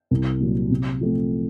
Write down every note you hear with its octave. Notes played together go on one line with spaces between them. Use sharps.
C2
A#2 F#3
C3
F3 A3 C4